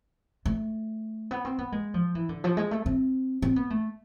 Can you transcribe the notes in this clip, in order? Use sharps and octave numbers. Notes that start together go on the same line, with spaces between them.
A3
B3
C4
B3
G#3
F3
E3
D3
F3
G#3
A3
C4
C4
B3
A3